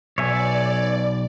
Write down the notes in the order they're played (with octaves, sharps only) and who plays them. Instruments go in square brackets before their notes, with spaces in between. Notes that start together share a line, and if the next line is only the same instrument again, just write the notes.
[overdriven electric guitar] B1 [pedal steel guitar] C#5 E5 G#5 [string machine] D5